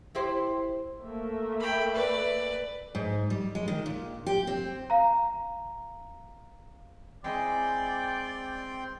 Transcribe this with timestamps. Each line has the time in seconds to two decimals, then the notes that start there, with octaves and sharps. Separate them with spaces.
0.15 E4 G4 C5
1.00 A3 A#3 E5
1.60 G5 B5
1.94 B4 D5
2.95 G#2
3.30 G3
3.55 G#3
3.68 D#3
3.86 A#2
4.26 G4
4.47 C4
4.90 F5 A#5
7.24 G#3 C4 E4 D5 G5 C6